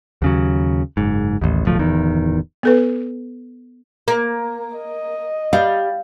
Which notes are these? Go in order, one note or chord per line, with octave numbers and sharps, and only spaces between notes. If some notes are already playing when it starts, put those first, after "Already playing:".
D#2 C#3 F#3
F#1 G#2
A1 D#2
D1 B1 F3 A3
D1 E2 D#3
B3 A4 B4
A#3
D#5
G3 F5